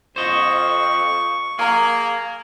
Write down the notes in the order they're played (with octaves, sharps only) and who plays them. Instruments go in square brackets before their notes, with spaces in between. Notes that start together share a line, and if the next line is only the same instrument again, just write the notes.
[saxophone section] F2 [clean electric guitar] C5 D#5 [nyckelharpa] C#6
[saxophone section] A#3 [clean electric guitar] G#4 [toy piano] F5 A#5 C#6